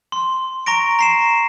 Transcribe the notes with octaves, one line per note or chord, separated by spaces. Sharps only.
C6
A#5 C#6 A#6 D7
A#5 C7 E7